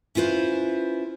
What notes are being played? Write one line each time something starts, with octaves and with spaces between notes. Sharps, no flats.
C#4 E4 F4 B4 C5